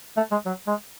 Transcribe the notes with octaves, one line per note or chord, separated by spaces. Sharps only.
A3
G#3
F#3
G#3